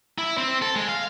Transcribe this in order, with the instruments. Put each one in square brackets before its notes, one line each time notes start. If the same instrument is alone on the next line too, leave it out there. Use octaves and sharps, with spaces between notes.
[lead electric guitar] E4
C4
A4
G#3
F5